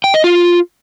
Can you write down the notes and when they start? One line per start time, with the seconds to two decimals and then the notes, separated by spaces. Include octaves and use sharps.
0.04 G5
0.14 D#5
0.24 F4